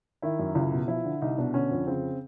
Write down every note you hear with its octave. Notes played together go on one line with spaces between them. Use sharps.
D#3 E4
F#2
C#2 E4
B2
F3 E4
D3
C2 D#4
B2 D4
D3 C#4
F2
C#3 C4